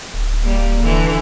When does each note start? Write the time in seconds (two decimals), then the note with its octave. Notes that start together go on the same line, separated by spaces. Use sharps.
0.14 D1
0.43 G3 A#3
0.80 D3 E3